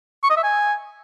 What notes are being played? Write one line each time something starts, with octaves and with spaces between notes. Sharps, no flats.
C#6
D#5
E5
G#5